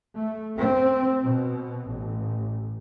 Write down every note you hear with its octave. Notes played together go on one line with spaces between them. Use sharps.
A3
C4
B2
A1